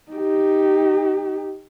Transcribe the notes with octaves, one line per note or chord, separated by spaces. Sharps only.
D#4 G4